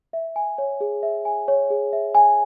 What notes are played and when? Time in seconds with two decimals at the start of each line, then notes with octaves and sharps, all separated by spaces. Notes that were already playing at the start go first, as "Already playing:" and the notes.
0.13 E5
0.36 G#5
0.58 C#5
0.81 G#4
1.03 E5
1.25 G#5
1.48 C#5
1.70 G#4
1.93 E5
2.15 G#5